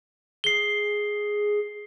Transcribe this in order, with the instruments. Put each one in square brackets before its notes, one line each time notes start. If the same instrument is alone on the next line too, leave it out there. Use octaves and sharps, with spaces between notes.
[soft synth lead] G#4 [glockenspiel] C7 G7